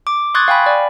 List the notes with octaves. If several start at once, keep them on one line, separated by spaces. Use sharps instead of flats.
D6
C6 C#6 D#6 F#6 G#6 A6
F5 G5 G#5 B5
D5 G#5